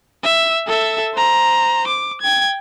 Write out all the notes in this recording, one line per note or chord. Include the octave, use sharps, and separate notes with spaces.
E5
A4 E5
C5 A#5
D6
G5 G#6